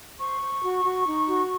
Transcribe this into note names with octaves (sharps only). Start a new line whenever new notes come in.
C5 C#6
C5
F#4
F#4
D#4
F#4